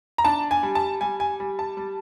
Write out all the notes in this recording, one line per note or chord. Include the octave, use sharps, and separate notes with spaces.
A#5
D4 A5
G#5
G3
A5
G3 G#5
G#5
G3
A5
G3